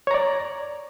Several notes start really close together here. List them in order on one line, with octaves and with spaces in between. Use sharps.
C#5 A#5 D5